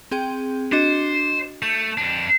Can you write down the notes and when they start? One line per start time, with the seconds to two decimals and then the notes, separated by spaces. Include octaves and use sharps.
0.11 C4 G#4 G5
0.72 D4 F#4 C5 D#5
1.62 A3 G6
1.98 F2 D4